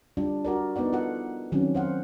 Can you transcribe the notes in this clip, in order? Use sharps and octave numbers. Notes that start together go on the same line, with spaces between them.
G3 D4 F4
D4 F#4 A#4 D5
B3 D#4 D5 F#5
F4 A4 F#5
D#3 F#3 C4 C#4
C5 F5 F#5